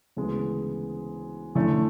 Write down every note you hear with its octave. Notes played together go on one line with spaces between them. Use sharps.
D2 C#3 E3 G#3 B3
E2 D3 A3 C#4